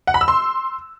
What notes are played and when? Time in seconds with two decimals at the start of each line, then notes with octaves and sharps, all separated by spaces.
0.07 F#5
0.14 B5
0.21 E6
0.28 C6